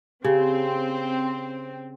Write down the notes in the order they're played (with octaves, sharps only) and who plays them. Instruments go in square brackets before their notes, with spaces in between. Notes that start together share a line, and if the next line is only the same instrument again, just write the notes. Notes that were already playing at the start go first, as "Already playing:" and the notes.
[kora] C#3 [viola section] C4 [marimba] G4